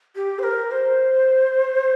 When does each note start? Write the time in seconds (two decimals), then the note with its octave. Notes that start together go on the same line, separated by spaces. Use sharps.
0.16 G4
0.39 C5
0.43 A#4
0.71 C5